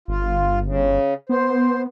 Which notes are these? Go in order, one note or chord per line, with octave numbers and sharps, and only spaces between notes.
G1 F4
C#3
B3 C5